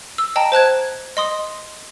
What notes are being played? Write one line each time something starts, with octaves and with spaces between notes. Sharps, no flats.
E6
D#5 G5 A5 A#5
C5 A5 F#6 G#6
D#5 C6 D#6